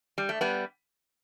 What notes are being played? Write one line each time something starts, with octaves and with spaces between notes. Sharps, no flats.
G3
A3
G3 B3